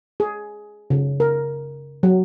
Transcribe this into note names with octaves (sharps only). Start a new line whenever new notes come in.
G#4
C#3
A#4
F#3